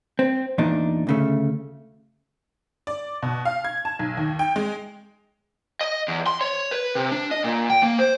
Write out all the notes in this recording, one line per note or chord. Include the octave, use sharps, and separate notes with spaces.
C4
E2 A#2 D4 D#4
D2 C#3 A3
D5
B2
F5
G#6
A5
B1
D#2
G5
G#3
D#5
E2
C6
C#5
B4
C3
D4
D#5
A#2
G5
A#3
C5